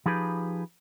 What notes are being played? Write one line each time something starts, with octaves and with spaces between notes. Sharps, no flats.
F3 D#4 G4 G#4 B4